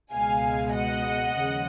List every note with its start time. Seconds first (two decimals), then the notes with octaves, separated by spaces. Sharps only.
0.13 C#2 B2 G#3 F5 G#5
0.74 D#5 F#5
1.37 D#2 C#3 F3 G#3